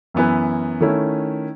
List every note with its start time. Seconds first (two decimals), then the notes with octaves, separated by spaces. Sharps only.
0.14 F#2 E3 B3 E4 B4
0.81 D#3 A3 C#4 E4